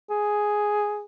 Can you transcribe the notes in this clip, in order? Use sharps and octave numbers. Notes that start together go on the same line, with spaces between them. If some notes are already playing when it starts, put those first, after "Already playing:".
G#4